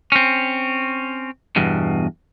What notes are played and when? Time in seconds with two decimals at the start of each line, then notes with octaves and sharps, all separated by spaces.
0.12 C4 C#4
1.56 E2 G2 B2